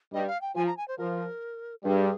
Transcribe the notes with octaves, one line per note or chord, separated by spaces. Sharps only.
G2 G3 D#5
F5
G5
F3 G#5
A#5
G#5
C5
F3 A#4
G2 G3 G#4